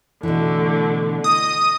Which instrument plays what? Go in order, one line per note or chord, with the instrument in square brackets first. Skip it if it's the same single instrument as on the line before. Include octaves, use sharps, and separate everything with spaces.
[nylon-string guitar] B2 E3 [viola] D3 A3
[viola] D#5 [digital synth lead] D#6